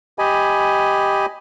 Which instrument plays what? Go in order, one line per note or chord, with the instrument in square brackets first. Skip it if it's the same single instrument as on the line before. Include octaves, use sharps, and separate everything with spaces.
[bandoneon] G4 D#5 G#5 B5